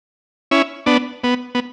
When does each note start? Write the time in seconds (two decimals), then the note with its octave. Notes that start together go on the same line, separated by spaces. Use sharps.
0.51 C#4 E4
0.86 B3 D4
1.24 B3
1.55 B3